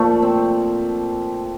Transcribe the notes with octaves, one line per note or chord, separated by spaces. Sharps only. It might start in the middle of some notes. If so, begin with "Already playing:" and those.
Already playing: A#2 F3 A3
C4